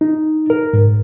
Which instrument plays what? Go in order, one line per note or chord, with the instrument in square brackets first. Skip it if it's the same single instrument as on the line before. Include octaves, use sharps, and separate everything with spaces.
[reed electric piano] D#4
A#4
G#2